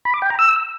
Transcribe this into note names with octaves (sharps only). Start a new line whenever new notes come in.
B5
D6
G5
A#5
E6